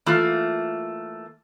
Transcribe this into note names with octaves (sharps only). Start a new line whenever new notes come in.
E3 A3 A#3 F4